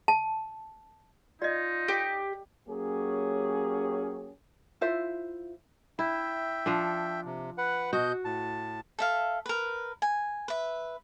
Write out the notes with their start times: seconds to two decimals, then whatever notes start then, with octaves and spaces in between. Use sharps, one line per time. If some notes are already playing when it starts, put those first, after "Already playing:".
0.08 A5
1.42 D#4 F4 D5 D#5
1.88 G4
2.69 F#3 A#3 C#4 G4 G#4
4.81 E4 F4 C5 E5
5.99 E4 E5 G5
6.66 F3 D4
7.25 C3
7.58 B4 F#5
7.93 B2 F#4 D#5 G6
8.25 A2 A5
8.99 A4 E5 F5
9.46 A#4 B4
10.02 G#5
10.48 B4 E5